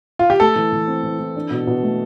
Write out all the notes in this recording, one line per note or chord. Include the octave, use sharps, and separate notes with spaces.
F4
G4
A3 A4
E3
E3
C4
E3
E3
D4
B2
B2
A3